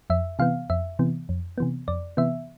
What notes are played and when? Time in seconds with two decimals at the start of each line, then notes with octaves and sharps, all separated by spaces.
0.10 F2 E5
0.39 C3 E3 B3 F5
0.70 F2 E5
0.99 C3 E3 B3
1.29 F2
1.58 C3 E3 B3
1.88 F2 D5
2.17 C3 E3 B3 E5